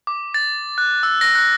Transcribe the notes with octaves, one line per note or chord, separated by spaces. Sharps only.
D6
A6
F#6
E6
A#6
F#6